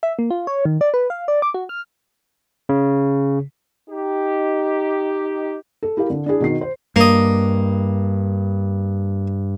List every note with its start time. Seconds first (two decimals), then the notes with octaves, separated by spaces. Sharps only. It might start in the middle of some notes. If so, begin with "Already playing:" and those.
0.03 E5
0.19 A#3
0.31 F4
0.47 C#5
0.65 D#3
0.81 D5
0.94 B4
1.10 F5
1.28 D5
1.42 D6
1.54 F#4
1.69 F6
2.69 C#3
3.90 D#4 G4
5.83 A4
5.97 E4 G4 A#4 F5
6.10 D3
6.26 D4 E4 G#4
6.40 B2 D#3 C7
6.61 C5
6.96 G2 A#3 D#5